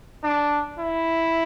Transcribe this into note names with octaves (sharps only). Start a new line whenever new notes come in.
D4
E4